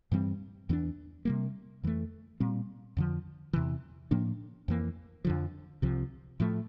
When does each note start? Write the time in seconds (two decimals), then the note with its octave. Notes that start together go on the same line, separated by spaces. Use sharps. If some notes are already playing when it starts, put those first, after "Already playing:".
0.12 G2 E3 G3 C4
0.69 E2 E3 A#3 D4
1.25 C3 G3 A#3
1.83 F2 E3 A3
2.40 A#2 G3 C4
2.97 F2 D3 F3
3.53 E2 C3 E3
4.11 A2 F3 A#3 D4
4.68 F2 E3 A#3
5.25 F2 D3 F3
5.82 C2 C3 F3
6.40 A2 F3 A3